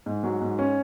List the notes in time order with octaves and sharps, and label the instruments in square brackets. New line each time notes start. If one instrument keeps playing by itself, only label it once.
[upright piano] G#2
F#3
G#2
C#4